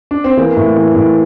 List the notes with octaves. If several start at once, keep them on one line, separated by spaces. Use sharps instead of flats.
D4
C4
E3 A#3
A2
E3
A2